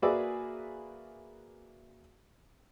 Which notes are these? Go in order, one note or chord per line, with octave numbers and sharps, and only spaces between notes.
A#3 F#4 G#4 B4 D5 E5